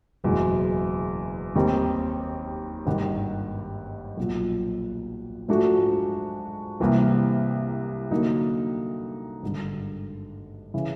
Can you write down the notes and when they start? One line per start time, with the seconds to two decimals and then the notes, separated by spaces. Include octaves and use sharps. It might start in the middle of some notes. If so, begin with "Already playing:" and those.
0.24 F#1 E2 B2 G#3
1.55 D#2 D#3 G3 C4 D#4
2.86 G#1 G2 D#3 G3
4.17 B1 A#2 F3
5.48 G#2 F3 A3 D4 F#4
6.80 C2 C3 E3 G3 A#3
8.11 D3 F#3 A#3 D#4
9.43 G#1 G2 D3
10.74 C#3 E3